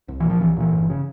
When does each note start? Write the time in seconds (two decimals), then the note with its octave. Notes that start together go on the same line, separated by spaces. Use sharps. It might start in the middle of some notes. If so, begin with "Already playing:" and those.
0.08 C2
0.20 A#2 E3
0.30 F3
0.40 C2 E3
0.57 A#2 E3
0.73 G1
0.90 C#3